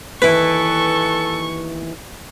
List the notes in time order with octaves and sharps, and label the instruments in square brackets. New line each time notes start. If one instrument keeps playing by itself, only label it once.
[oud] D#2 E3 [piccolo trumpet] A4 [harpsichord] B4 [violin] C#6